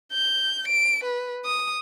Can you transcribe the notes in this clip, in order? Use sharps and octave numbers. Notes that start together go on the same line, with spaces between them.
G6
D7
B4
D#6